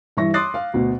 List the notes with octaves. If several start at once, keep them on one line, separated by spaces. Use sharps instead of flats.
G2 E3 E5 C#6 A#6
C6 D6 D#6 F#6 A6 C7
F5
D2 B2